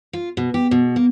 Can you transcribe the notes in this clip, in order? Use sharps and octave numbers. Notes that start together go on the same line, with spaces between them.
F4
B2
G4
B2
A#3